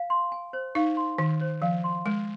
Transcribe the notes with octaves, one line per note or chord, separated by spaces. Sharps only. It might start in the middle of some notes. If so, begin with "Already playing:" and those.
Already playing: F5
C6
G#5
C5
D#4 F5
C6
D#3 G#5
C5
F3 F5
C6
G#3 G#5